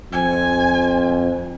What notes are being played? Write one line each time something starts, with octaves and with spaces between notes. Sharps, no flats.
F2 G#5